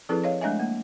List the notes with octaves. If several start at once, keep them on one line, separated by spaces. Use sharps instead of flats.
F3 C4 E4 G#4 A4 B4
C#5 D#5 F5
G#3 A3 D4 D#5 E5 G#5
A#3